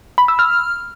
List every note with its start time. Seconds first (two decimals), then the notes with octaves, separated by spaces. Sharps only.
0.18 B5
0.28 E6
0.39 F6